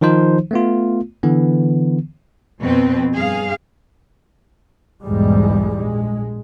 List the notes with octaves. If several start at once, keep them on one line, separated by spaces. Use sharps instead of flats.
D#3 F3 D#4 C5
A3 B3 F4
D3 E3 B3
F2 B2 C4 B4
G2 G#4 F5
B1 E2 G#2 G3 G#3
A#1 G#3